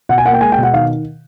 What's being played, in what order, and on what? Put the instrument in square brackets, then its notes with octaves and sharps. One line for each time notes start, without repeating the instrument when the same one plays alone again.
[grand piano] B2 F#5
G#5
A#3 F#5
G5
G#3 G#5
G5
B2
F#5
D#3 F5